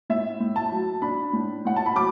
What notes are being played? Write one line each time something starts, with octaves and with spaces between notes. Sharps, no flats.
A2 E5
A2
A5
F#3
D4 B5
A2
A2 F#5
A5
B5
F#3 D6